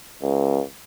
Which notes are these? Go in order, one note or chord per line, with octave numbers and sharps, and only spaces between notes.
C#2